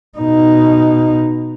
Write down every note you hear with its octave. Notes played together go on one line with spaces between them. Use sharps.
B2 D#4